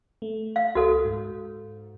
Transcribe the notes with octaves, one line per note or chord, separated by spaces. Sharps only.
A3
F5
C#2 F#4 A4
G#2